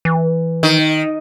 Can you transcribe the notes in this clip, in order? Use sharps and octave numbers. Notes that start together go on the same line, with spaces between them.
E3
D#3